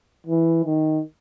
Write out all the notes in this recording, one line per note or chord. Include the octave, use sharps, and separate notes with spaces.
E3
D#3